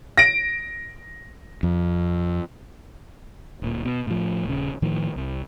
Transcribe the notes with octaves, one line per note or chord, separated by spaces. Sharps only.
A#6 D7
F2
D1 A#2
B2
A2 F3
D#1 C#3
A2 D#3 F3
C2